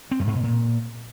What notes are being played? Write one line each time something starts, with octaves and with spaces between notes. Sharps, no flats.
C4
F#2
G#2
B2
A#2